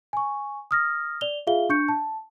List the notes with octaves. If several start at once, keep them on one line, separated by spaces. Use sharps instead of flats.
G#5 C#6
D#6 F6 A#6
D5 F7 G7
F4 G#4 E5 F5 G7
D4 C#6 G6 C#7
A5